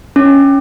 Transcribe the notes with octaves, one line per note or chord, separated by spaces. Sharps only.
C#4